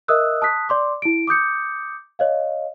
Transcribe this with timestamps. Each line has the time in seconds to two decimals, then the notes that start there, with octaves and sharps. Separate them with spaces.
0.08 A#4 D#5 E5 D#6 E6 F#6
0.42 A5 D#6 F#6 B6
0.69 D5 C6 D6
1.02 E4 D7
1.27 D6 D#6 G6 C#7
2.19 C#5 D#5 F5